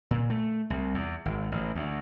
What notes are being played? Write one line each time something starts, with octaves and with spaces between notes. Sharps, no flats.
A#2
A3
C2
E2
G#1
A1
D2